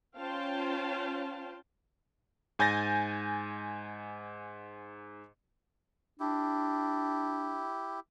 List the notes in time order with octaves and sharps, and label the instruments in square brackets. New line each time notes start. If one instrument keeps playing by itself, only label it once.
[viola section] C#4 F4 C5 F5 G5 A5
[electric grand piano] G#2 G#5 G6 A6 A#6
[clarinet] D4 [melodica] E4 G4